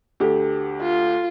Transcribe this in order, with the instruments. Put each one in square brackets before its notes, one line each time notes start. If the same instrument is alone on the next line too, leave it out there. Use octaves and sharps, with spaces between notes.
[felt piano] D2 G4
[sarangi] F4